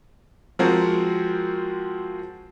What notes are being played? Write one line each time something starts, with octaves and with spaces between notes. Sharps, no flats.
F3 G#3 C4 F#4 A#4